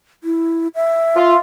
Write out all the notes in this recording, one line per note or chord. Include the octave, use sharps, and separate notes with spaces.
E4
E5
F4